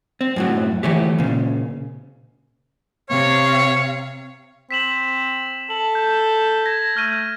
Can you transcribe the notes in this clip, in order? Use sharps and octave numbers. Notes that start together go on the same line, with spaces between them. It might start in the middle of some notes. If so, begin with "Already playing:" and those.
C4
F#2 A2 F#3
E3 F#3 A3 G4
A#2 C#3
C3 C#5 F5
C4 B6 E7 F#7
A4 F#7
G6
G#6 A#6
A3 F6 A#6 D#7